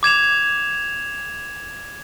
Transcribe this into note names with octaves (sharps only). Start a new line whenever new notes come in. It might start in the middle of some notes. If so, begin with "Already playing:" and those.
D6 G#6 E7 F7